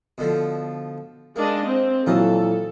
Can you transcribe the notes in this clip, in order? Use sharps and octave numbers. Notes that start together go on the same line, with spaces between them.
B2 D3 F3
G#3 A#3 D4 D#5
C4
A#2 E3 F#3 F4 A4 D#5